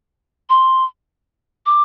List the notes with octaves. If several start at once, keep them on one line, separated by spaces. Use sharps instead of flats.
C6
D6